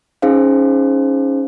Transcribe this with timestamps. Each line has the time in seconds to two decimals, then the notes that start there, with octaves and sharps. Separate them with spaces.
0.22 C#4 D#4 G#4 C5 F5